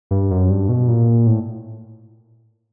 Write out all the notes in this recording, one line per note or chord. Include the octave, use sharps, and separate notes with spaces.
G2
F#2
G2
B2
A#2
A2